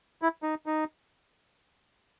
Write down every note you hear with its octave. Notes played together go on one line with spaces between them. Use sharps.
E4
D#4
D#4